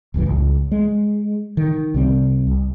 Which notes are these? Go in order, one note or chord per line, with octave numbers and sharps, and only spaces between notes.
D1 C#2 G2 E3
C#2
G#3
D#3
C2 C3 G3 C4
C2